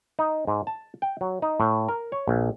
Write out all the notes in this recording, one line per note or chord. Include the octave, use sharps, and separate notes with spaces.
D#4
G#2
A5
G5
F#3
D#4
A2
A#4
C#5
A#1